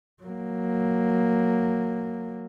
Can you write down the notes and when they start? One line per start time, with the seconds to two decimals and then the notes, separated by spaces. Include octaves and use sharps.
0.22 F#3 A#3